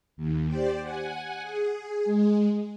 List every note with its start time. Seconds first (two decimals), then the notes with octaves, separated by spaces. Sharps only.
0.17 D#2
0.47 G4 C5 D5
0.81 F#5 G#5
1.42 G#4
2.05 G#3